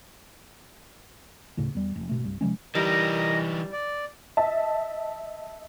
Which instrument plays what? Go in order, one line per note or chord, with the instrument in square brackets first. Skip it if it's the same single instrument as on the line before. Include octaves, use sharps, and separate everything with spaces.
[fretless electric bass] D2 A2 C#3
E2 G3
F1
G#1 B2 A3
C2 G2
C3 F3 G#3 C#4
[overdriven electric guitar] E3 D#4 [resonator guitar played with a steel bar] G3 [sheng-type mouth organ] A#4 D#5
[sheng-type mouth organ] D5
[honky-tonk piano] D#5 E5 A5